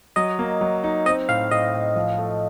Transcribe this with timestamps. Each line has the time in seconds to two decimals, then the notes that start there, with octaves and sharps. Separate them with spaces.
0.16 F#3 D#5
0.39 A#3
0.61 F#3
0.84 D#4
1.06 C4 D#5
1.29 A2 F5
1.51 A2 D#5
1.74 A2
1.96 F3
2.18 A3